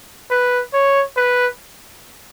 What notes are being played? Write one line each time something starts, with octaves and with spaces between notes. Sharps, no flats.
B4
C#5
B4